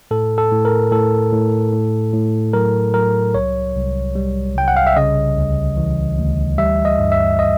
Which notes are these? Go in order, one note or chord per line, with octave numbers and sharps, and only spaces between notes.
A2 A4
A4
A2
A#4
A2 A4
A2
A2
A2
F#3 A#4
F#3 A#4
C2 C#5
C2
G3
C2 G5
F#5
F5
E5
C#3 D#5
D2
E3
D2
G3 E5
D#5
G2
E5
D#5